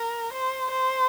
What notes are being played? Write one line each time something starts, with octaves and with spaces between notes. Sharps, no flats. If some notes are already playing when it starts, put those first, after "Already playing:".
Already playing: A#4
C5
C5